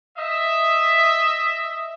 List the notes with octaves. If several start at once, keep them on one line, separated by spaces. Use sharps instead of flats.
D#5 E5